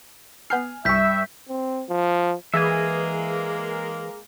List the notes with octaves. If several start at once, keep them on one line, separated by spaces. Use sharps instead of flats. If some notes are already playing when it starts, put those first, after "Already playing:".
B3 G#5 F6 G6 C7
C2 G2 E5 C#6 G6 B6
C4
F3
E3 G#3 A#3 G#4 E5 G#5